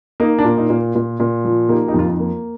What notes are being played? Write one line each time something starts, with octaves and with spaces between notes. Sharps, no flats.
A#3 D#4
D4
A#2
D#4
A#2
A#2
A#2
F3
A#3 D#4 G4
D#4 G4
F2 F4
D#4
A#3